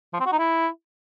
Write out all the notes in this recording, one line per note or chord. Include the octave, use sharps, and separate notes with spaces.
F3
C4
F#4
D#4
E4